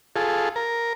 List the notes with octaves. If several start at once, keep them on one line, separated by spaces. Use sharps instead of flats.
F4 G#4 A4
A#4